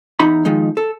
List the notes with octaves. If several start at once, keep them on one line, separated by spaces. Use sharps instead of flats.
E2 D#4 A#5 B5
D#3 F3 G#3 D#4
A4